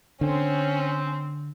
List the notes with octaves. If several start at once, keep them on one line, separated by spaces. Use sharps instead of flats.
D3 C4 C#4